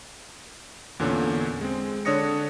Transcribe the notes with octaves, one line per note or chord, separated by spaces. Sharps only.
E2 A#2 D3 C#4
G#3 C4
D3 D4 C#5 D#6 A#6 C#7